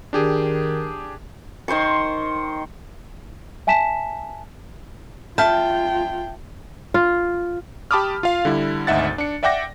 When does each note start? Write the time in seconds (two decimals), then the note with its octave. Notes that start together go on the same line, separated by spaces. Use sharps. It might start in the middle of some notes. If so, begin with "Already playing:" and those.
0.13 D#3 D4 G4 G#4
1.68 D#3 C5 C6 C#6
3.67 E5 G#5 A5 B6 E7
5.38 F4 E5 G5 A5 F6 G6
6.94 F4
7.91 G4 A5 B5 D6 D#6 F6
8.23 F4 F5
8.45 D3 G3 E4
8.87 G#1 D2 D#4 E5 F#5 A6
9.18 D4 C#7
9.43 D5 E5 F#5 G5 D6 A#6